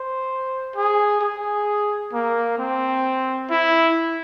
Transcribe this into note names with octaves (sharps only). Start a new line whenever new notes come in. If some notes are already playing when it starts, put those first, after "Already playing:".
Already playing: C5
G#4
G#4
A#3
C4
E4